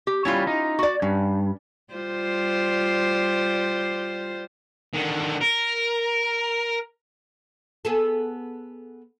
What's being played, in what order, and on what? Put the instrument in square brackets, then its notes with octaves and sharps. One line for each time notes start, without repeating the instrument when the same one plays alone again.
[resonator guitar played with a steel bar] G4
[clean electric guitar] G3 C#5 [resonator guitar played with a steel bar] C#4 E4 F4
[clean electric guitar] D#4
[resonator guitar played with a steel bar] F#4 D5
[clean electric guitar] G2 [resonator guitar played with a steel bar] C#4
[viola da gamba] G3 F4 C5
[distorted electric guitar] D3 D#3
A#4
[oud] B3 G#4 A4